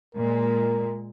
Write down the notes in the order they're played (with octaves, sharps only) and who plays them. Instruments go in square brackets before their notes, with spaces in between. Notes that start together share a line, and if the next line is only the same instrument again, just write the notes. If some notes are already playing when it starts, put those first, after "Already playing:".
[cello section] A#2 G#3 [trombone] A#4